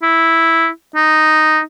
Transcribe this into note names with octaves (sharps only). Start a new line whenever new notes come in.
E4
D#4